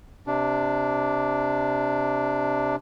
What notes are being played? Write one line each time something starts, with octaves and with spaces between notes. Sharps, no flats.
C3 D4